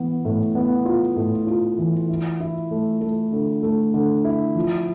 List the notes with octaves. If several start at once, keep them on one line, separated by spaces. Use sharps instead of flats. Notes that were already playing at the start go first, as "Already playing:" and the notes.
Already playing: E3 B3
A2
B3
F4
A2
F4
E3
E4
E4
A3
A3
D3
A3
D3
E4
F3